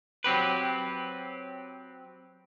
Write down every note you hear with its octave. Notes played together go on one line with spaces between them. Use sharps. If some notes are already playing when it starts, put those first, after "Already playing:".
F#3 C4 G4 B4